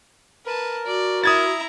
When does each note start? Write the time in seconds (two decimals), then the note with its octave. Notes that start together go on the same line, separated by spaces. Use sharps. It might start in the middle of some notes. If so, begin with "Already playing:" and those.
0.46 A#4 B4 A5
0.86 F#4 D5
1.24 E4 A#5 D#6 G#6 A6